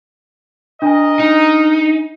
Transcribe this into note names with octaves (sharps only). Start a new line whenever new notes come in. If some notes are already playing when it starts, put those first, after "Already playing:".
D4 A#4 D#5 G#5
D#4